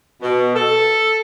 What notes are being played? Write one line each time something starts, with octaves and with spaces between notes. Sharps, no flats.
B2
A4